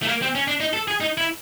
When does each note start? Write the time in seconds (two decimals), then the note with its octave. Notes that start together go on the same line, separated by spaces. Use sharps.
0.02 A3
0.08 A#3
0.22 C4
0.35 C#4
0.48 D4
0.60 D#4
0.73 A4
0.88 G#4
1.00 D#4
1.18 E4